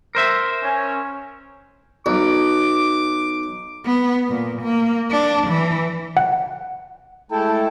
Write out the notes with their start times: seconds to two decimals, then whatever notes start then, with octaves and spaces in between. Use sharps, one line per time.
0.15 A#4 C5 E5
0.62 C#4
2.06 B1 D6
3.86 B3
4.29 A#2
4.62 A#3
5.11 D4
5.48 E3
6.17 F#5
7.32 G#3 A3 E4 A4 G5 A5